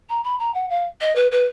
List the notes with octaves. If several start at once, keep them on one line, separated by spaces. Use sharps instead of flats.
A#5
B5
A#5
F#5
F5
D#5
B4
B4